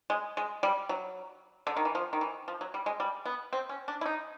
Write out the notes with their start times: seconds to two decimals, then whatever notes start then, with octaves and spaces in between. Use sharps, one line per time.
0.10 G#3
0.37 G#3
0.63 G3
0.89 F#3
1.67 D3
1.76 D#3
1.85 E3
1.95 F3
2.13 D#3
2.21 E3
2.48 F3
2.61 F#3
2.74 G3
2.86 G#3
3.00 G3
3.25 B3
3.53 C4
3.69 C#4
3.88 D4
4.01 E4
4.06 D#4